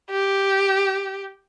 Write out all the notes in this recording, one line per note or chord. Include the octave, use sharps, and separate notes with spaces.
G4